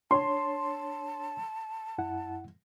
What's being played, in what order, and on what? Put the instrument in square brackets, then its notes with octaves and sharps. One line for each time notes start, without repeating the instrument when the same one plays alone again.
[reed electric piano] D4 C#5 [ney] A5 [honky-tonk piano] C6
[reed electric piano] F#2 E4 F#5